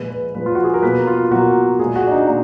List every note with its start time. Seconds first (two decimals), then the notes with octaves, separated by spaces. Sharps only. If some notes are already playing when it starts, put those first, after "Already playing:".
Already playing: A#2 F3 G#3 B4
0.10 B4
0.34 A#2 F3 G#3 B4
0.46 F4
0.55 F#4
0.64 G#4
0.74 A#4
0.82 B2 F#3 A#3 B4
1.07 F4
1.25 F4
1.31 B2 F#3 A#3 F#4
1.79 A#2 G#3 G#4
1.96 F#4
2.07 D4
2.12 D#4
2.28 A#2 D#4